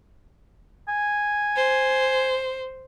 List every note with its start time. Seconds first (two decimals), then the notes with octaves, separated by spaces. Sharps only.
0.88 G#5
1.56 C5